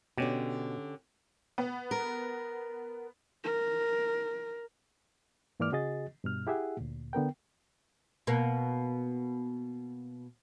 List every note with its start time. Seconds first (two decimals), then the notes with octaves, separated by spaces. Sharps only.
0.18 B2 D3 C#4 G4
1.58 B3
1.91 A#4
3.44 A#4
5.60 G#2 E3 A#3 D5 D6 F6
5.72 C#3 F#4 G#4 D#5 A6
6.24 G2 B2 F6
6.47 E4 G4 G#4 E5 F#5
6.77 D2 A#2
7.13 D3 B3 A#4 G5
8.27 B2 A#3